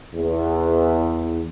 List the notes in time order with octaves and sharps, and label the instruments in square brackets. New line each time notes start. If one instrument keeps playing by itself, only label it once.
[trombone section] E2